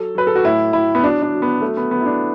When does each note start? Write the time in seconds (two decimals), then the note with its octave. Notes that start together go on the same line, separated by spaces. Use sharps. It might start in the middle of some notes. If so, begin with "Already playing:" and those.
Already playing: F#3 A4
0.15 F#3 B4
0.27 A4
0.36 F#4
0.44 A2 E4
0.73 A2 E4
0.95 B3
1.03 F#3 D4
1.22 D4
1.33 F#3
1.42 B3
1.62 F#3 A3
1.77 B3
1.91 F#3 B3
2.01 E4
2.06 D4